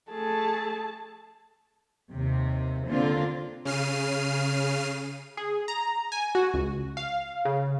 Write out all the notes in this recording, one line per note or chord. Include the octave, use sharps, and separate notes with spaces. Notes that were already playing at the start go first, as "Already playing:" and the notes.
A3 G#4 A5
D#2 C3
D3 A#3 C4 D4 F4
C#3 F6 C7 D#7
G#4
A#5
G#5
F#4
C#2
F5
C#3